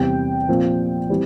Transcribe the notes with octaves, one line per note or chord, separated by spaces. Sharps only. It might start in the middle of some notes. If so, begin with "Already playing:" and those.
Already playing: E2 C3 G3 G5
A#2 F3 C4
E3 G3 C4